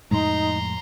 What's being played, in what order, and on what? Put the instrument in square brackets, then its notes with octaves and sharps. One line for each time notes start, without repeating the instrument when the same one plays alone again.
[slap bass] F2 A2 G#3 [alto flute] D#4 [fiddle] A#5 C6